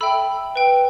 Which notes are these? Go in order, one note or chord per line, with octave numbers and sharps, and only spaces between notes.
A4 E5 G5 B5 E6
B4 G5